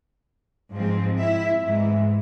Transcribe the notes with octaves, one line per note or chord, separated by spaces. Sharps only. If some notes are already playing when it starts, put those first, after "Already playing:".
G#2 F3 G#3 C4
E4 E5
G#2 E3 G#3